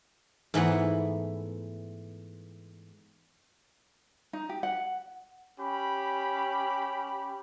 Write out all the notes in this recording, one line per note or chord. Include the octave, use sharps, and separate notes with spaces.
G#2 E3 A3 B3
D#4
G4
F#5
C#4 G4 B5